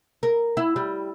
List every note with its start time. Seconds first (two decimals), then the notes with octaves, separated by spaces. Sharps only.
0.23 A#4
0.57 E4
0.76 G3